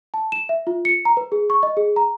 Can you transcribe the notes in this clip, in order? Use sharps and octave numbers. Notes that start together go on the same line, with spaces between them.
A5
E7
E5
F4
C#7
A#5
B4
G#4
C#6
D#5
G#4
A#5